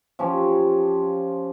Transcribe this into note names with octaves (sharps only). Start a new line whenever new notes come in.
F3 C#4 G4